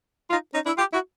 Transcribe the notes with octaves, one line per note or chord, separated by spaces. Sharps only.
D#4 F4
C#4 D#4
D4 E4
F4 G4
E4 F#4